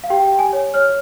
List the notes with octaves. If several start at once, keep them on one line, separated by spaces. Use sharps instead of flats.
F5
G4 G5
G5
G4
G#5
C#5
C#5 F6